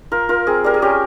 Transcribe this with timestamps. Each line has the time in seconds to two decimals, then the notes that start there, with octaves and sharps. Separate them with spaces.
0.12 F4 A#4
0.29 F4 A#4
0.47 C4 G#4
0.64 G3 A#4
0.74 G#4
0.82 C#4 G4